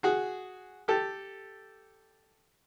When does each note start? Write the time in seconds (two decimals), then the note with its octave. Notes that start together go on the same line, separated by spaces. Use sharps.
0.03 F#4 G#4
0.88 G4 A4